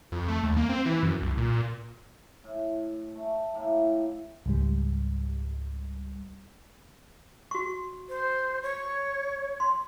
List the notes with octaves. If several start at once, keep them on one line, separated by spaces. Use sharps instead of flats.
F2
A3
D#2
A#3
C4
E3
F#2
C2
A#2
A2
A3
A2 A#3 E4 G5
C#2 G#2 G3
F#4 C#6
C5
C#5
C6